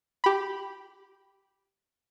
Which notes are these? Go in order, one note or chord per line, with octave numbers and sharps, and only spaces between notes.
G4 B5